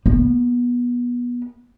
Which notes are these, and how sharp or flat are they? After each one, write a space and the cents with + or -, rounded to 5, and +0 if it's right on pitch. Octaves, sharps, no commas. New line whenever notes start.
B3 -25